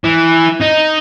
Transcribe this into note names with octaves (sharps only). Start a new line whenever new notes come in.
E3
D#4